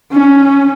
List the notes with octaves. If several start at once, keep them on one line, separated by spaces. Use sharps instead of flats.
C#4